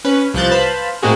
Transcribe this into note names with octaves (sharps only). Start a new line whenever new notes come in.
C#4 B4
C2 F3 F#6 G6 A6
B4 C5 F5 A5 B5
A2 G#3 A#3 C4 F#4 G#4